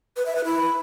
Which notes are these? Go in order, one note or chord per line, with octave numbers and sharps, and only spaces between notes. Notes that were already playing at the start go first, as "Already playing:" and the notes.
B4
E5
B4
E4